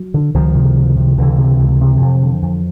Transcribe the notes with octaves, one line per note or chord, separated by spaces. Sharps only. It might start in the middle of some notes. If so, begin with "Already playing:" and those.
Already playing: F#3
D3
C#2 D#3 F3
C3
C#2
C3
C#2 D3 E3
C3
C#2
C3
F2
D3
F2